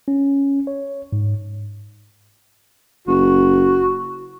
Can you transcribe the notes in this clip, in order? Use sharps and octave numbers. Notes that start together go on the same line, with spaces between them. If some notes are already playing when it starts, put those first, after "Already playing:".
C#4
C#5
G#2
F#1 F#4